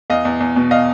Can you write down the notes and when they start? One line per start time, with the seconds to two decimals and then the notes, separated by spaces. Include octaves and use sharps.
0.10 E2 D#5 F5
0.25 E2
0.40 E2
0.56 B2
0.71 D#5 F5